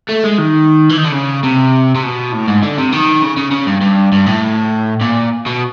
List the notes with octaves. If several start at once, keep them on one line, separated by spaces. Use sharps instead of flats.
A3
G#3
D#3
E3
D#3
D3
C#3
C3
C3
B2
A2
G#2
D3
C3
D#3
C#3
C#3
C#3
G2
G2
G2
A2
A#2
B2